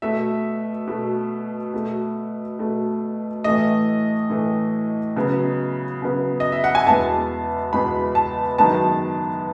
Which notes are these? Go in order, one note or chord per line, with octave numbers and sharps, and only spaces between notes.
B2 A3 E5
B2 A3
B2 A3
B2 A3
A2 E3 A3 D#5
A2 E3 A3
C#3 F#3 B3
C#3 F#3 B3
D#5
E5
F#5
G#5
E2 B2 G#3 B3 A5
E2 B2 G#3 B3 B5
A5
F#2 D#3 G#3 B3 A5